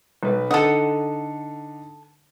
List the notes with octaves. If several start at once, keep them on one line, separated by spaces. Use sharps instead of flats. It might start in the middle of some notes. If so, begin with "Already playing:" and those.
B1 B4
D3 D#4 A4 F#5 D#6